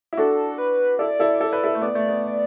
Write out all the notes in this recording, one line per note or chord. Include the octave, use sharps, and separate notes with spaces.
E4
D4 F#4 A4
B4
E4 A4 D5
E4 A4
A4
B4
E4 A4
A3
B3 D5
A3
B3